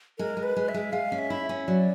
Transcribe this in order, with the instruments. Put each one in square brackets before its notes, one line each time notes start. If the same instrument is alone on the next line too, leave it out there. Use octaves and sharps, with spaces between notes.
[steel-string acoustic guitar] G#3 [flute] A#4
[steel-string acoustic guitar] G#3
[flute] B4
[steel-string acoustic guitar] G#3
[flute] E5
[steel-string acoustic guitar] G#3
[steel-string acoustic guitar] G#3 [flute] F5
[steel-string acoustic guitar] C#4
[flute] E5
[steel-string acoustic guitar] E4
C#4
[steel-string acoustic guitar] F#3 [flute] D5